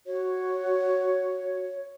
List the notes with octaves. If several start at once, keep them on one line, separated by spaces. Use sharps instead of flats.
F#4 C#5